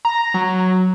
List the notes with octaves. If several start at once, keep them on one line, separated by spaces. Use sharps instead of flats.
A#5
F#3